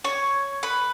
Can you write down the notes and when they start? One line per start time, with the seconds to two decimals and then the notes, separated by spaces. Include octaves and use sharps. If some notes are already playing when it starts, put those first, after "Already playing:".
0.04 C#5
0.63 B4